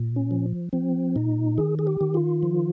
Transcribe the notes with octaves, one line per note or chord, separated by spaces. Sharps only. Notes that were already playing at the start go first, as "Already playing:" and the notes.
Already playing: A#2
C#4
F3
F3 C4
A#2 D#4
D#3 G#4
G#4
G4
D#3
F4
F3